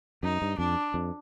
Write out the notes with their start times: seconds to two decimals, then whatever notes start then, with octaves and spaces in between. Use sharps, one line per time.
0.23 F#2 D#4
0.42 G2
0.58 F2 D4
0.94 F2